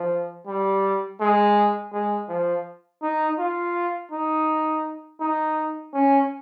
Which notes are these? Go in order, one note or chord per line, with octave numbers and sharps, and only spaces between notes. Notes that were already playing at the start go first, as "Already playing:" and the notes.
Already playing: F3
G3
G#3
G#3
F3
D#4
F4
D#4
D#4
C#4